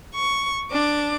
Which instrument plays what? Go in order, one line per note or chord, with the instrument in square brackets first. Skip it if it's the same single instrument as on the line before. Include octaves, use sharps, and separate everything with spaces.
[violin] C#6
D4 D6